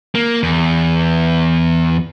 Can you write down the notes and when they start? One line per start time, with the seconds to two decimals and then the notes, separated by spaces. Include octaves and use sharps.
0.15 A#3
0.43 E2